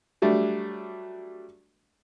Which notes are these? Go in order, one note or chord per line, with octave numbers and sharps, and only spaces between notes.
F#3 G3 A3 D4